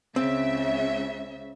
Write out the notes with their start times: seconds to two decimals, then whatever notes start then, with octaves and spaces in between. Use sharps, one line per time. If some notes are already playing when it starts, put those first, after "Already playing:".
0.16 C#2 C#3 C4 E5